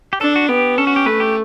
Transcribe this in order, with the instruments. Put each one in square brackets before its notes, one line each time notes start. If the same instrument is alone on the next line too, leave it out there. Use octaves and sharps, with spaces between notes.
[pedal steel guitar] G4
[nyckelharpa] D4 [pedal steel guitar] A4
[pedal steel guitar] F#4
[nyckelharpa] B3 [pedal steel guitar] G4
[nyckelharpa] C#4 [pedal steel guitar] A4
[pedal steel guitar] F#4
G4
[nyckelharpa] A3 [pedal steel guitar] B4
[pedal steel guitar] G4